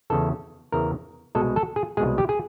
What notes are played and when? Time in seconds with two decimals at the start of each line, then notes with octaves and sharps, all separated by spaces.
0.10 E2 C#3 E3 A4
0.72 E2 C#3 E3 A#4
1.35 C2 B2 G#3 A4
1.56 A4
1.76 G#4
1.97 C2 B2 G#3 G#4
2.18 G4
2.29 G#4